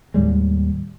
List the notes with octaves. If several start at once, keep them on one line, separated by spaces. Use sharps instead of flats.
D#2 A2 G3 G#3